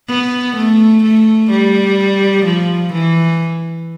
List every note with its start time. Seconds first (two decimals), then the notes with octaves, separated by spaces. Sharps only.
0.08 B3
0.56 A3
1.04 A3
1.50 G3
2.45 F3
2.93 E3